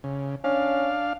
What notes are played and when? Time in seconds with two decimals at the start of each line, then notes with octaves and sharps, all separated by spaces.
0.04 C#3
0.44 C#4 D4 F5